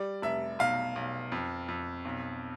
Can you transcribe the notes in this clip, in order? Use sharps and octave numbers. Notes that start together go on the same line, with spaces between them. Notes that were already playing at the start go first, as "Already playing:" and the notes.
Already playing: G3 D5
F1 E5
B1 F5
B1
F2
F2
B1